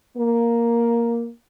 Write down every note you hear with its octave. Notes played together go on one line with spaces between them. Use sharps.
A#3